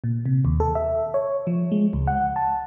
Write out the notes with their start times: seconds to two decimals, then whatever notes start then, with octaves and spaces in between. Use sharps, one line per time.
0.04 A#2
0.26 C3
0.45 D#2
0.60 A4
0.75 E5
1.14 C#5
1.47 F3
1.72 G#3
1.93 C#2
2.07 F#5
2.36 A5